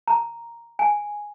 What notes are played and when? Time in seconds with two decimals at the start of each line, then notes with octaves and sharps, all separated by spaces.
0.08 A#5
0.79 G#5